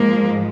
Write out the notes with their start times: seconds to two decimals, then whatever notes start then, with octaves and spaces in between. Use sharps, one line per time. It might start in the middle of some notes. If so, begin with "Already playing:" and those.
Already playing: G#2 F3 G#3 A#3